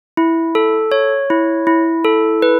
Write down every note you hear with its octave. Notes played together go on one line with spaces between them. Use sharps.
E4
A4
C#5
E4
E4
A4
B4